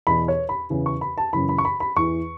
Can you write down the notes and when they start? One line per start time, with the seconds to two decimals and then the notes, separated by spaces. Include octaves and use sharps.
0.07 E2 B2 B5
0.28 C#5
0.49 B5
0.70 E2 C#3 E3
0.86 C#6
1.01 B5
1.18 A5
1.33 F#2 C#3 E3 B5
1.49 B5
1.58 C#6
1.65 B5
1.80 B5
1.96 E2 E3 C#6